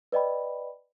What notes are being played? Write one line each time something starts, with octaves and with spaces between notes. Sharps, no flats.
B4 D5 D#5 G5 B5